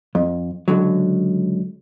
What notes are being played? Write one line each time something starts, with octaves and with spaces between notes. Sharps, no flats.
F2
C#2 D3 F#3